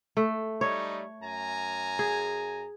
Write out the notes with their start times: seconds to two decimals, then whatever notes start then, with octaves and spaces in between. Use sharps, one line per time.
0.17 A3
0.61 G3 A3 D#4 C#5
1.23 F#2 G#5 A#5
1.99 G#4